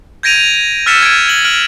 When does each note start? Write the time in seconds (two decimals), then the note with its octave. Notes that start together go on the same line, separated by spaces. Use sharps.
0.23 G6 G#6 A#6 D7 D#7 F7
0.86 E6 F6 A6 B6 C#7 E7
1.02 G#6 D7
1.28 G#6 F#7
1.45 F6 D7 F#7